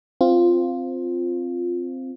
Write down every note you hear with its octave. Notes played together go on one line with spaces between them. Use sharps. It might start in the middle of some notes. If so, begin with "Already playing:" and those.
C4 F4